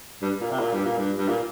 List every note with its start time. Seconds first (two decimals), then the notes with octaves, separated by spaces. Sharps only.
0.22 G2
0.41 A#2
0.51 C3
0.60 A#2
0.72 G2
0.85 A#2
0.98 G2
1.17 G2
1.28 A#2